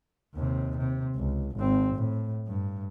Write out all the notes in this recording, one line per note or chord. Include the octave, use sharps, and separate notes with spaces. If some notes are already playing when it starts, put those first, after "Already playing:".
D#2 C3
C3
C#2
G#1 C4
A2
G2